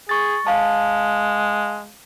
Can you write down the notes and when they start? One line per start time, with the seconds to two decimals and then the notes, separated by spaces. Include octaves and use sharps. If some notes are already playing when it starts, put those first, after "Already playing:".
0.09 G#4 C#6 A6
0.47 G#3 F5 A5